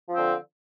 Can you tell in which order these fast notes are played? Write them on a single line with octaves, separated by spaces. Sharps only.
F3 C4 D3